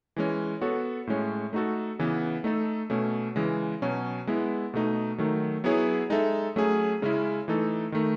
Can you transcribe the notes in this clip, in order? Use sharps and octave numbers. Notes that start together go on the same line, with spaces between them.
E3 G#3 C#4
B3 F#4 A4 C#5
A2 G#3 C#4
A3 D#4 F#4 A4
C#3 E3 B3
A3 D#4 A4
B2 A3 C#4
C#3 E3 G#3
B2 F#3 C#4
G#3 B3 E4
B2 A3 D#4
D#3 F#3 A3
F#3 B3 E4 G#4 C#5
G#3 D#4 A4 E5
F#3 A3 C#4 G#4
C#3 G#3 C#4 E4
E3 A3 D#4 A4
D#3 A3 D#4